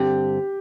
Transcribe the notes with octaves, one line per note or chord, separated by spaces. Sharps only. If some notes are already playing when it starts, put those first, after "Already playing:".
Already playing: G2 D3 C4 G4